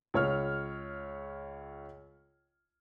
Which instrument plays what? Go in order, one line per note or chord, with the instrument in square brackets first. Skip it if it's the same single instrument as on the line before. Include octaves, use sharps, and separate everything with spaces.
[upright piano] C#2 C#5 F6